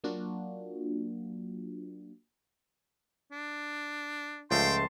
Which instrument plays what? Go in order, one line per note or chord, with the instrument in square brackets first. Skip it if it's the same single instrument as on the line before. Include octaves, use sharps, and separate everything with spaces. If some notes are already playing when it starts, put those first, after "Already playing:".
[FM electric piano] F#3 A#3 D4 F4 F#4
[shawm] D4
[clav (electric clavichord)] C#2 F3 A3 [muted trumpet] G5 [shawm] A5 [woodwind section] C6